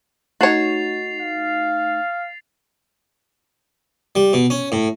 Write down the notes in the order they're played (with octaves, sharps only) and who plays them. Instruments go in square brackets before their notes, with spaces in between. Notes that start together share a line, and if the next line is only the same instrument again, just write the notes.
[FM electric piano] A3 D#4 [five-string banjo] F#4 C#5 [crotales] A6 C7 F7
[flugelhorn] F5
[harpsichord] G3
B2
C#4
A2